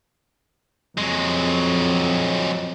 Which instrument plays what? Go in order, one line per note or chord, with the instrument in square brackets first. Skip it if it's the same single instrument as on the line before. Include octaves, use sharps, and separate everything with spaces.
[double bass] F2 [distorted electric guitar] F#3 G#3